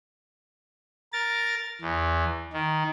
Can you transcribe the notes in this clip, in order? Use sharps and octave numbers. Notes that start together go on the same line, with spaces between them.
A#4 A6
E2
D#3